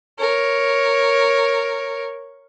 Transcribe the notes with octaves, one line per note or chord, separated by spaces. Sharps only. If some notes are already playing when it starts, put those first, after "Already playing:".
A#4 C#5